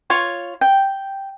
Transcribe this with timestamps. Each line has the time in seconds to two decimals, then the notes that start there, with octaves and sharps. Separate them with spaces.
0.10 F4 C#5 C#6
0.61 G5